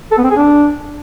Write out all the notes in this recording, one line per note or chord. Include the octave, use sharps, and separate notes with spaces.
A4
B3
C4
G#4
D4